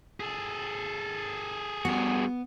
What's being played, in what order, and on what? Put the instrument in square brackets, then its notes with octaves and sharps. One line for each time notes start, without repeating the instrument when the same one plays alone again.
[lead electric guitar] G#4 A4
[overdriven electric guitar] G2 F#4 [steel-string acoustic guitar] B3